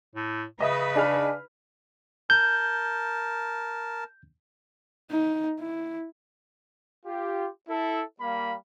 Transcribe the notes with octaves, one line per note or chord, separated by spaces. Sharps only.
A2
C#3 B4 D#5 E5 D#6
D4 D#4 G#4 F6
A#4 A5 G6
D#4
E4
F4 G4
E4 A4
G3 A#3 F5 B5